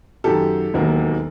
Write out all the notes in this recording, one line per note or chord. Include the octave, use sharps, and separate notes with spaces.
F#2 D#3 F#3 G4 A4
E1 D#2 D#3 F#3 A#3